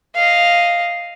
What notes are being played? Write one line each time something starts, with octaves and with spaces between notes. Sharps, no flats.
D#5 F5